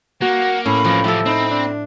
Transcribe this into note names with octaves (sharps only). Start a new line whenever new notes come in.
A#3 F#4 F#5
A2 C#4 B5
E3 F3 A#3
F3 E4 G4 A4
C4 D#4 B5
D4